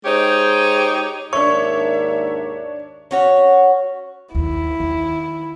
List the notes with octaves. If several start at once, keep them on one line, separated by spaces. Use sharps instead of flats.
G#3 D#4 G4 C5 C#5
D#2 G#2 D4 A#4 C#5 E5 C#6
C#4 F#4 C#5
D#2 E4
D#3